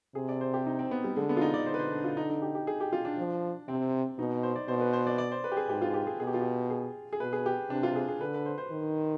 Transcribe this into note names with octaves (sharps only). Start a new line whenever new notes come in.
C3 G#4
D5
C5
G4
D#4
C4
B3
G3
D3 G#3
B3
F4
D#4
D5
D3 C5
B4
C5
D4
F4
D#4
D#4
G4
G4
G#4
G4
F4
D4
F3
C3 C4
B2 D#4
C5
D5
B2 C5
B4
C5
D5
D5
C5
B4
G4
G#4
G#2 G4
F4
G4
G#4
B2 G#4
G4
F4
G4
G#4
G#4
B2 B4
G#4
G4
C3 D4
F4
G#4
G#4
D3 B4
B4
C5
C5
D#3